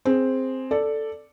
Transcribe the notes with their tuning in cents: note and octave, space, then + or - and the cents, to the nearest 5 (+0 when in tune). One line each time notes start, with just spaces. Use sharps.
C4 +0 G#4 +0
A4 +5 D5 +0